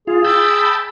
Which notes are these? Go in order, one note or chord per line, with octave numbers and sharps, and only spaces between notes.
F4 G#4
G5 A5 B5 E6